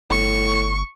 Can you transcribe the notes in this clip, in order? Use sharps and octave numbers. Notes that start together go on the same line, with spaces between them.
G1 A2 C#6